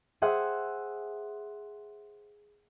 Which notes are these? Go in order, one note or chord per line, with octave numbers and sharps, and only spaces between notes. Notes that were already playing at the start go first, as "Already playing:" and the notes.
G#4 C5 E5 F#5